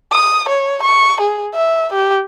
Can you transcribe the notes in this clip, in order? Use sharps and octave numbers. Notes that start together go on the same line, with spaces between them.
D#6
C#5
C#6
G#4
E5
G4